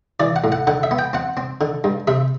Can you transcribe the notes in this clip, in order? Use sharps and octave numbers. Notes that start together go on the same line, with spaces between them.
E3 D5
F#5
A2
F#5
D3 F#5
E5
B3
G5
C4 F#5
C4
D3
G2
C3 E5